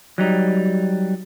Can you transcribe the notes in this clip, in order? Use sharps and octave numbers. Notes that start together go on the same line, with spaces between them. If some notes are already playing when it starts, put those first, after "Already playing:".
F#3 G3 D#4